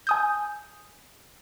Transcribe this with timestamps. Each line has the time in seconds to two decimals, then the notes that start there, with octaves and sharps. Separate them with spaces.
0.07 G#5 D#6 G6